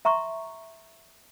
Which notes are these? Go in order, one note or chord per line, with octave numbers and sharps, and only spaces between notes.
E5 A#5 C6 C#6